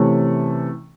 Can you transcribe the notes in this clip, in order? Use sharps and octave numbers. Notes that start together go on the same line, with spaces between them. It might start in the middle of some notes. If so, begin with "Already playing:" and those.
Already playing: C3 E3 A3 C#4